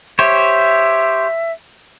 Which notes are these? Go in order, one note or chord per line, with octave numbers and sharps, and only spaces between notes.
G4 C5 C#5 E5